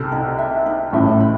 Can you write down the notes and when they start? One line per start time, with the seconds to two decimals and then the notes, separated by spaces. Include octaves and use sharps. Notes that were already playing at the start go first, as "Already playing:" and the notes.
Already playing: C2 C3 A4
0.12 D#4
0.39 E5
0.66 D#4
0.92 A1 A2 E5
1.20 B5